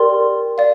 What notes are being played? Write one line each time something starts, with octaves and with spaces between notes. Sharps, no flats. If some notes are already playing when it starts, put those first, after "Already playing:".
Already playing: G4 A#4 D5 G5 C6
D5 F5